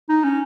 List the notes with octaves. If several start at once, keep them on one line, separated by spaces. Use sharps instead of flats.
D#4
C#4